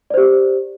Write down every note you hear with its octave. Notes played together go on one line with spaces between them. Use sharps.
G4 C5 D5